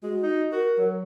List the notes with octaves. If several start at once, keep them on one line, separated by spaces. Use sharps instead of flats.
G#3 F#4
D#4
F#4 A#4
F#3